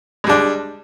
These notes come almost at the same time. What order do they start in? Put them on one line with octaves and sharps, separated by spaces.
G#3 G3 D4